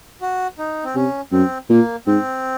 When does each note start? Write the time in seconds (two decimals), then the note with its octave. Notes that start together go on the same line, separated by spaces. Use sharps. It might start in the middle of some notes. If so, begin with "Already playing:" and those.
0.21 F#4
0.58 D#4
0.84 C4
0.95 C3 C#4
1.32 F#2 C4
1.69 A#2 A#3
2.07 G#2 C4